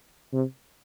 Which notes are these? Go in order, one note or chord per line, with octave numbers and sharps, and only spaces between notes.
C3